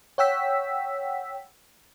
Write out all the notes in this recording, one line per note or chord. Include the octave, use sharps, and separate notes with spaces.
C#5 F#5 G5 E6 B6